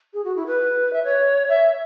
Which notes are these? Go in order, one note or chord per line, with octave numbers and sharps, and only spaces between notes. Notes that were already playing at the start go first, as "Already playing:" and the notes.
G#4
F#4
E4
B4
E5
C#5
E5